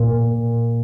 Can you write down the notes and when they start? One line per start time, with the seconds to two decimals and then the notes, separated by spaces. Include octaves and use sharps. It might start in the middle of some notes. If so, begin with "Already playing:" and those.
Already playing: A#2